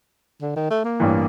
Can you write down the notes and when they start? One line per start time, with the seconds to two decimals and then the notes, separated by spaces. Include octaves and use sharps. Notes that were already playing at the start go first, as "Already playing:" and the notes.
0.41 D3
0.56 D#3
0.70 A3
0.84 A#3
1.00 A1 G2 E3